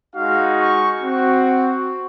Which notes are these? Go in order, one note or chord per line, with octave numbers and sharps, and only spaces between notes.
G#3 D#4 F#4 F5
C#6
C4 F#4